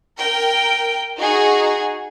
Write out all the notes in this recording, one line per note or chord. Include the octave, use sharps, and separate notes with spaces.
A#4 G5
D#4 F#4 G#4